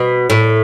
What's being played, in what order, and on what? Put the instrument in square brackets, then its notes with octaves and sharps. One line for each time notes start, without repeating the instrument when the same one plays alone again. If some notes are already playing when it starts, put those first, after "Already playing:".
Already playing: [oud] B2
A2